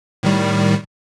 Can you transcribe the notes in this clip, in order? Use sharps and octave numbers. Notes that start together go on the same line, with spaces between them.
A2 D#3 G3